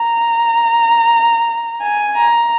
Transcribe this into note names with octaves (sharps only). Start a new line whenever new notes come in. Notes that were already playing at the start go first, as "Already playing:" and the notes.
Already playing: A#5
G#5
A#5